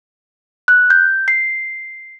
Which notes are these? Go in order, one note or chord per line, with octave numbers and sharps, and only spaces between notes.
F#6
G6
C7